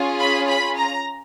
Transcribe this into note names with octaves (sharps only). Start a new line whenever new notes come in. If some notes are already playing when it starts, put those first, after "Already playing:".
Already playing: C#4 F4 G#4
B5
B5
A#5